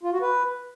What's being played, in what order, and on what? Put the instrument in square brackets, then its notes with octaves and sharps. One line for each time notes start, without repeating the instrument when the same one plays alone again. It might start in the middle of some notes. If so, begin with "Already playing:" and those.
[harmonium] F4
F#4
B4